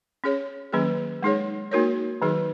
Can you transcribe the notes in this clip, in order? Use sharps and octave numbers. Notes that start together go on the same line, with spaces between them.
C#4 G#4 C#5
D#3 F#3 A#3 C#4 G#4
G#3 D#4 G#4 C#5
A#3 D#4 F#4 A#4 C#5
D#3 F#3 D#4 G#4